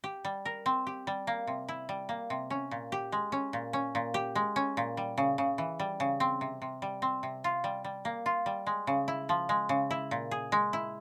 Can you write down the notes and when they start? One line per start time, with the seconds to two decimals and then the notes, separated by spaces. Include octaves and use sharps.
0.04 G4
0.25 G3
0.45 A#4
0.66 C4
0.87 G4
1.07 G3
1.27 A#3
1.47 C3
1.69 E4
1.89 G3
2.09 A#3
2.30 C3
2.50 C#4
2.71 A#2
2.92 G4
3.12 G#3
3.32 C#4
3.53 A#2
3.73 C#4
3.95 A#2
4.14 G4
4.35 G#3
4.56 C#4
4.77 A#2
4.97 G3
5.18 C#3
5.38 C#3
5.58 E3
5.79 G3
6.00 C#3
6.20 C4
6.41 C3
6.62 C3
6.82 G3
7.02 C4
7.23 C3
7.44 F4
7.64 G3
7.84 G3
8.05 A#3
8.26 F4
8.46 G3
8.67 G#3
8.87 C#3
9.08 E4
9.29 F3
9.49 G#3
9.69 C#3
9.91 E4
10.11 A#2
10.31 G#4
10.52 G#3
10.73 E4